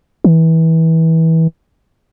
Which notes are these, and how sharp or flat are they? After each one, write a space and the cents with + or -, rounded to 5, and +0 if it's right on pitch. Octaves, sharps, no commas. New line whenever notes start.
E3 -25